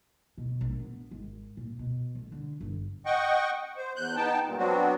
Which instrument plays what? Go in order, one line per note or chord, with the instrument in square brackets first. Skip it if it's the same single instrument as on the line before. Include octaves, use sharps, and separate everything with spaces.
[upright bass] B2
A#1
B3
G#1
A#2
B2
A1
D3
G1
[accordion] D#5 F#5 G5 C#6
C5
E2 F#6 G6
B3 D#4 G5 A5
G2 A#2
F#3 B3 C4 D4 F#4